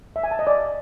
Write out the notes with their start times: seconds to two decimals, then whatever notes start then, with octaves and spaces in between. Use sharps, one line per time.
0.16 E5
0.23 G#5
0.31 A5
0.39 D#5
0.47 D5